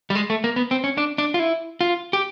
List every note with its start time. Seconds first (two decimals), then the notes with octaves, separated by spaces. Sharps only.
0.10 G3
0.15 G#3
0.30 A3
0.44 A#3
0.56 B3
0.71 C4
0.84 C#4
0.98 D4
1.18 D4
1.34 F4
1.39 E4
1.81 F4
2.13 G4